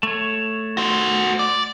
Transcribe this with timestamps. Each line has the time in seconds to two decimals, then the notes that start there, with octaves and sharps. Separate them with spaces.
0.03 A3 C#5
0.77 F#4 C5
1.39 D5